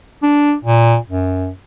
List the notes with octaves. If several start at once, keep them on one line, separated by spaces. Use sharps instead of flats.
D4
A#2
F#2